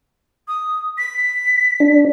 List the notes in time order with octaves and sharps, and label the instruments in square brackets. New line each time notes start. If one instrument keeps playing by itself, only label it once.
[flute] D#6
B6
[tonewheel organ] D4